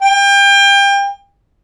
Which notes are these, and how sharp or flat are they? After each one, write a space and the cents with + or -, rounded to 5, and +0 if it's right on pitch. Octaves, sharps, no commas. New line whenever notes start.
G5 +30